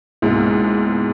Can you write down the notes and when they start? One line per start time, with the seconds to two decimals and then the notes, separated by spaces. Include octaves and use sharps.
0.22 C#2 G#2 B2 G#3 A#3 E4